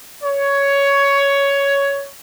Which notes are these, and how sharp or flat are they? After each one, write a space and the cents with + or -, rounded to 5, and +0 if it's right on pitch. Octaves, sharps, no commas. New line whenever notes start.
C#5 +10